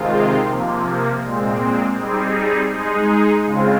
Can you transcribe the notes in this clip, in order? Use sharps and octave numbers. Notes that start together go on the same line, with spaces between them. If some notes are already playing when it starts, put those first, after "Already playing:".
Already playing: C3 D#3 G#3 C4 F4
C3 F3 A#3
A#2 G#3 C4
G3 C4 D#4 G#4
G#3 D#4 G#4
C#3 G#3 C4 F4